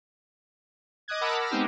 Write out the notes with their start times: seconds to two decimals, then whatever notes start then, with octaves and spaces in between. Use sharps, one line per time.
1.08 D#5 D6 D#6 F#6 G#6
1.21 A#4 F#5 A5 B5 D6 E6
1.39 D6 E6 F6 A#6
1.50 G#3 B3 C4 D#4 G4